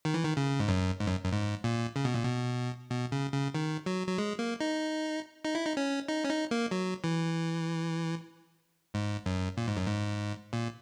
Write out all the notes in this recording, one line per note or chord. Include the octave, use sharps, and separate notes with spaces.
D#3
E3
D#3
C#3
G#2
F#2
G#2
F#2
F#2
G#2
A#2
C#3
B2
A#2
B2
B2
C#3
C#3
D#3
F#3
F#3
G#3
A#3
D#4
D#4
E4
D#4
C#4
D#4
C#4
D#4
A#3
F#3
E3
G#2
F#2
A#2
G#2
F#2
G#2
A#2